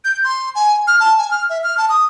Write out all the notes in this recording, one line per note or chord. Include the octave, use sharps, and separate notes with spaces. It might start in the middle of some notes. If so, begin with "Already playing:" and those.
G6
C6
G#5
F6
A5
G#5
F6
E5
F6
A5
D#6